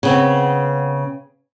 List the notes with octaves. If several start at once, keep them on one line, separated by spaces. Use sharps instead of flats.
C#3 B3 C4